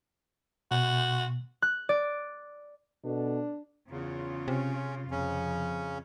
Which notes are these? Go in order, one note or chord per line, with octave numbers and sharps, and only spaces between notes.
B2 F#4
F#6
D5
B2 D4 A4
E2 C#3 F4
C3 C#4
F2 C#3 C#4